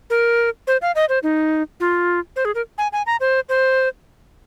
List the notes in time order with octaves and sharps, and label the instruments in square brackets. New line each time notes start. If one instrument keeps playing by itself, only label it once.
[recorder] A#4
C5
F5
D#5
C5
D#4
F4
C5
G#4
A#4
G#5
G#5
A#5
C5
C5